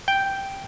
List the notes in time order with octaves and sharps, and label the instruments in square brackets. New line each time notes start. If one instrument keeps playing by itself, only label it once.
[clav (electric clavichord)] G5